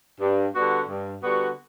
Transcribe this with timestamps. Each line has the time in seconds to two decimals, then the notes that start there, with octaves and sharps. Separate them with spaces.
0.20 G2
0.54 D3 G3 B3 F#4
0.89 G2
1.23 D3 G3 B3 F#4